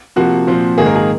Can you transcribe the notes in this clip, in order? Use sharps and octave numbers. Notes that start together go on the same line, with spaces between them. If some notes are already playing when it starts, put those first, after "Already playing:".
C3 F3 A#3 F#4
A#2 F3 C4
G#2 D#3 A#3 G#4
A#4
G#4